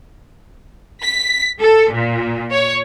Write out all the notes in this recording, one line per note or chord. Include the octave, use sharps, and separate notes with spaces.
B6
A4
A#2
C#5